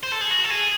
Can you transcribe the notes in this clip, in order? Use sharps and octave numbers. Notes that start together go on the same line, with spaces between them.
C5
A4
G#4
F#4
A4
G#4